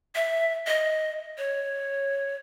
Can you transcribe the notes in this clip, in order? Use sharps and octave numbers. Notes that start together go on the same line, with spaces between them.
E5
D#5
C#5